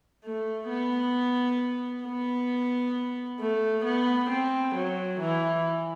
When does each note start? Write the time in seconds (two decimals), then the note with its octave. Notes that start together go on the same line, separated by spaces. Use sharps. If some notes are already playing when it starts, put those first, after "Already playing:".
0.24 A3
0.69 B3
2.05 B3
3.40 A3
3.85 B3
4.30 C4
4.75 F#3
5.20 E3